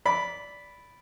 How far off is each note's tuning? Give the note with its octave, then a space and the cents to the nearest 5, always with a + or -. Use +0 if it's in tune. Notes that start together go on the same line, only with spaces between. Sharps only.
D5 -15 B5 +0